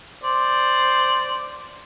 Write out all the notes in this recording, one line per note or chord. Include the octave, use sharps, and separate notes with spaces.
C5 D5